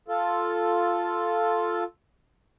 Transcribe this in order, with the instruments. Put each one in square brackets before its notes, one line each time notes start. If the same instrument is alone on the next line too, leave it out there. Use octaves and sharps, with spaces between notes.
[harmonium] F4 A4